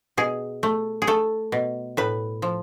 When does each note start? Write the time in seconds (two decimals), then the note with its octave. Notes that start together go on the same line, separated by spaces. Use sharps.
0.17 B2 G#4
0.63 A3
1.02 G#4
1.07 A3 A4
1.52 B2
1.97 A2 B4
2.42 F3